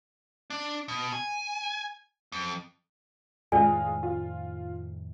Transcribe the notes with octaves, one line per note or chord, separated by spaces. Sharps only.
D4
B2
G#5
F2
F2 A2 D#3 G#3 F4 D5 G#5
F4